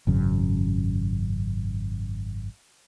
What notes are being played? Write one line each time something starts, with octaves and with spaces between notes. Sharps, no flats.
G#1 F#2 C#3